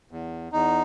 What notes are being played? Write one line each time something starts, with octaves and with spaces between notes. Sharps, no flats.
E2
E2 D#4